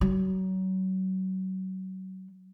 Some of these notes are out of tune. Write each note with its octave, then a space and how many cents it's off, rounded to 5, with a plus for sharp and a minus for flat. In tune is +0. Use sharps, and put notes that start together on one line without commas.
F#3 +30